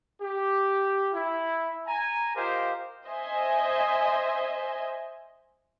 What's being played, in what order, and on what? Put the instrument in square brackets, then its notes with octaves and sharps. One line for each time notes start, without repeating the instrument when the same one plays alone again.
[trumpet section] G4
E4
G#5 A#5
F4 G4 A#4 C5 D#5 F5
[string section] C5 D#5 E5 G#5